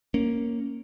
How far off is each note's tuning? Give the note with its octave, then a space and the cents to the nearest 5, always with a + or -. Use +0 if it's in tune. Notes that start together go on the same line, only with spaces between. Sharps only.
A#3 +0 C#4 +0